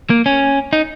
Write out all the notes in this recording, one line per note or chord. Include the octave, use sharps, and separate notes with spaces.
A#3
C#4
D#4